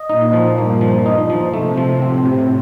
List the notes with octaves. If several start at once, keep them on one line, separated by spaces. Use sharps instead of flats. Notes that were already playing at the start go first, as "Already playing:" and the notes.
Already playing: D#5
A#2 D#4
F3
G2 A#3
F3
D#4
F3
C3 A3
F3
A2 C4
C3